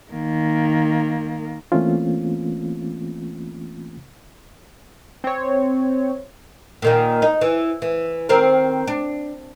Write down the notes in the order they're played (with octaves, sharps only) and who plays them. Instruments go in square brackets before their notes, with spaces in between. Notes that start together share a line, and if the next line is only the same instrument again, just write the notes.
[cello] D#3 A#3
[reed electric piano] E3 A3 A#3 C4 C#4 F4
[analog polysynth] C4 C#5
[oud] A#2 D#3 A#3
D#4
E3
E3
D#3 C4 A#4
D4